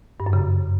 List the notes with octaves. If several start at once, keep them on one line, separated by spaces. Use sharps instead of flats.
G2
F#2
C#3